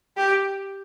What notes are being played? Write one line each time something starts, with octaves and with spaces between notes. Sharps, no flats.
G4